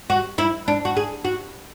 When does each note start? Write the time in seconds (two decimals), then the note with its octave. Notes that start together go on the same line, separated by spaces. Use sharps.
0.10 F#4
0.38 E4
0.68 D4
0.85 F#4
0.97 G#4
1.25 F#4